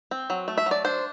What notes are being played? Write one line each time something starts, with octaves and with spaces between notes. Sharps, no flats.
C4
F#3
A3
E5
F#3 D5
D4 C5